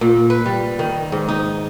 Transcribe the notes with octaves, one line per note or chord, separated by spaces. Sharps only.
A#2
B4
G3
D#3
G#2
D#4